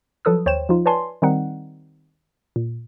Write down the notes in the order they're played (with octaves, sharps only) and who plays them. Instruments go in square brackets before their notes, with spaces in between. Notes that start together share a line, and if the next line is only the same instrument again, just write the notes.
[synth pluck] F3 F#3 A4 B4 D#6 E6
D#2 C5 C#5 G5 E7
F3 D#4 F4
B4 C#5 D5 G#5 A5 C6
D#3 G3 C4 D#4 F#5
A#2